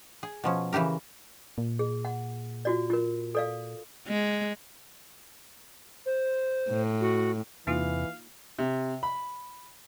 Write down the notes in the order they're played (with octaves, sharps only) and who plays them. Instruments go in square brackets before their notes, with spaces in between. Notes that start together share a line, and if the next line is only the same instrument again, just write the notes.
[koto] G#4
B2 F3 C#4
C#3 E3 E4 G4 A#4
[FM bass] A#2
[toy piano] G#4
F#5
F4 F#4 D5
F4 A#4
A4 D5 F5
[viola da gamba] G#3
[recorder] C5
[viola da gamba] A2
[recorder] F#4
[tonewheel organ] E2 C3 [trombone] E3 [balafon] A#3 D#4 F4 [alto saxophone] F5
[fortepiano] C3
B5